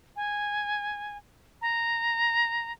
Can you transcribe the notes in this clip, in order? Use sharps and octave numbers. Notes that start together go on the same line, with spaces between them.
G#5
A#5